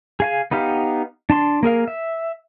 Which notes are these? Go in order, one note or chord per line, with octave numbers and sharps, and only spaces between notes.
G#4 F5 G#5
B3 D#4 G4 F5
D4 A5 C6
A#3 G#4 A#4 F5
E5